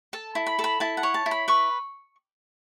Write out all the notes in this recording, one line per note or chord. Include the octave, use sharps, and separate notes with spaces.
A4 A5
E4
B5
A4
B5
E4 A5
F#5
C#5
A5
E4
B5
B4 C#6